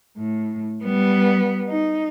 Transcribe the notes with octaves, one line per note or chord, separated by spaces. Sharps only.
A2
G3 B3
D#4